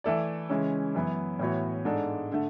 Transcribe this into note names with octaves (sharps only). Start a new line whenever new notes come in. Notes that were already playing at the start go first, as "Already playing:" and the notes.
E3 A3 E4 A4 D5
C#3 E3 G#3 C#4
F#2 E3 B3
A2 E3 B3 F#4 C#5
G#2 G#3 D4 A4 D5
D3 A3